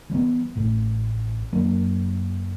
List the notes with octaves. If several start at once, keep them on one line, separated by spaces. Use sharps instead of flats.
E3 G3 A#3 B3
A1 A2
F#1 F#3 A#3 D4